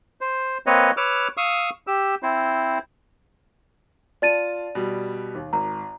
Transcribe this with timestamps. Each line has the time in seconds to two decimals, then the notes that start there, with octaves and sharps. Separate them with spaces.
0.21 C5
0.66 A#3 C4 B4 C#5 D#5
0.97 B4 C#5 D6 E6 F6
1.37 F5 C#6 D#6 E6
1.87 G4 E6
2.23 C4 E4 C5
4.22 F4 D5 A5 A6 D#7
4.75 B2 G3
5.35 D#2
5.53 G#1 A#5